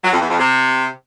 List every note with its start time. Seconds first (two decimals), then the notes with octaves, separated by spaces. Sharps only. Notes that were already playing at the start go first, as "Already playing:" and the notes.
0.03 F#3
0.12 F2
0.21 E2
0.30 F2
0.39 C3